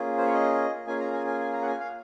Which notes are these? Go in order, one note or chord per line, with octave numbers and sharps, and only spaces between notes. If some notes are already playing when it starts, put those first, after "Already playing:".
Already playing: A#3 C#4 F4 G#4
C5
C#5
D#5
A#3 C#4 F4 G#4 G#5
A#5
G#5
G#5
G#5
A#5
F#5
G#5
F5